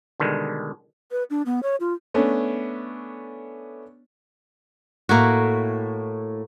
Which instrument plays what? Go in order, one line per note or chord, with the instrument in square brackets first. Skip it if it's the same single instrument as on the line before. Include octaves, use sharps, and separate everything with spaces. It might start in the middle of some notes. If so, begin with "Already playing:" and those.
[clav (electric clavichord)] B2 D3 D#3 G3 G#3
[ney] B4
D4
B3
C#5
F4
[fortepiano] A3 B3 C#4 D4
[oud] A2 [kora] A#3 E4 F#4